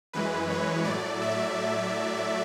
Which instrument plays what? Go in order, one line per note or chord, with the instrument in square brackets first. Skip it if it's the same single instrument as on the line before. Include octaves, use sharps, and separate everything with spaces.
[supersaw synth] F#2 E3 G#3 B4
C#5
A2 F#3 A3 D5
E5